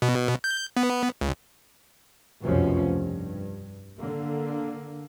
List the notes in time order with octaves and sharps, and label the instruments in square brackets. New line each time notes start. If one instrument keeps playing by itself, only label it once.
[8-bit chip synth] B2
G6
B3
C#2
[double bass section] F1 C2 F#2 B2 F3 C#4
G2
D3 A#3